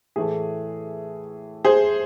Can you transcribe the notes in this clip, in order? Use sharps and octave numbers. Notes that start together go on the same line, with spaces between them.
A2 E3 A3 G#4
G#4 C5